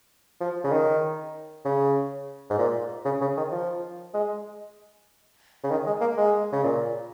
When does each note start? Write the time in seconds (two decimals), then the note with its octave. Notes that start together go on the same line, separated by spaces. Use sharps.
0.40 F3
0.64 C#3
0.72 D#3
1.65 C#3
2.50 G#2
2.58 A#2
3.05 C#3
3.21 C#3
3.37 D#3
3.52 F3
4.14 G#3
5.64 C#3
5.71 D#3
5.86 G#3
6.01 A#3
6.17 G#3
6.52 C#3
6.63 A#2